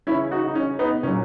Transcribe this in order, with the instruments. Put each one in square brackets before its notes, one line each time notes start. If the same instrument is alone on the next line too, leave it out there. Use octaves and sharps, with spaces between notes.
[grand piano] C#3 E3 C#4 E4
D#4 F#4
D#4
C#4
B3 D#4
A#2 C#4
F#3